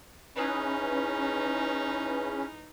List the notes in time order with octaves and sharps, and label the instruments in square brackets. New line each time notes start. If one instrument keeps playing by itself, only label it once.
[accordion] C#4 [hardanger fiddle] D#4 [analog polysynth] E4 G#4 B4